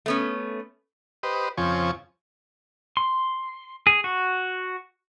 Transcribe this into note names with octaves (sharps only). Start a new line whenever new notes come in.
A3 B3 C#4
G4 B4 C5 D#5
F2 C#3 F3 C4 G#5 C#6
C6
G#4
F#4